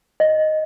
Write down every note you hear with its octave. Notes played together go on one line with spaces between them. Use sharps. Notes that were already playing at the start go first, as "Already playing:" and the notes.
D#5